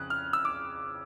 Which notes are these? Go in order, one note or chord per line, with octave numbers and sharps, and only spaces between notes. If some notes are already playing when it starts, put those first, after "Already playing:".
Already playing: F2 C#3 F#6
F6
E6
D6